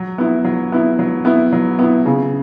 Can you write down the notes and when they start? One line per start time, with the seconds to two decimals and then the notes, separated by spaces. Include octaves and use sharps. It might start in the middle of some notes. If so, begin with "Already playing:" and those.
Already playing: F#3
0.18 B3 E4
0.45 F#3
0.72 B3 E4
0.99 F#3
1.25 B3 E4
1.52 F#3
1.79 B3 E4
2.06 C#3